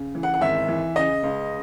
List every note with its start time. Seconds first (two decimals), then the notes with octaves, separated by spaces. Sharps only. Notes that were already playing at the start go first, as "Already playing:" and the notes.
Already playing: C#3
0.15 E3
0.23 F#5
0.34 F#5
0.41 G#1 E5
0.68 E3
0.96 C#3 D#5
1.23 C#2